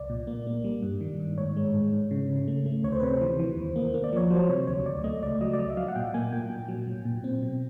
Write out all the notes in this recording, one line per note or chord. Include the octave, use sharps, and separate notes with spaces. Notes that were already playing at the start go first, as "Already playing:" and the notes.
Already playing: C2 D5
A#2
A#3
A#3
G3
G2
D#3
G2
G#2 C#5
G#3
G#2
G#2
C#3
C#3
A3
A3
D2 C#5
C5
B4
C3
C5
E3
E3
D#2
A#3
A#3
D5
F3 C#5
F#3 C5
C3 C#5
D2 C#5
D2 D5
A3 D#5
C#2 D5
F#3 D#5
D5
F#3 D#5
E5
F#3 F5
F#5
A#2 G5
A#3 G#5
A#2 G5
A#2
F#3
A#2
A#2
C4
B2